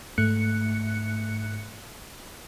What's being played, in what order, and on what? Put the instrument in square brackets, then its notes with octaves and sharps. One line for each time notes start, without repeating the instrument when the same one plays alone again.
[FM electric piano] G#2 A3 F#6 C#7